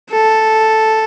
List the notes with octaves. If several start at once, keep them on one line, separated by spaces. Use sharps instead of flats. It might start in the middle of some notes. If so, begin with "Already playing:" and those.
A4